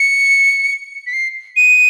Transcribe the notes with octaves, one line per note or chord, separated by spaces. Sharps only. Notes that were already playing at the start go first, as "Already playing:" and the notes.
Already playing: C#7
B6
C7
D#7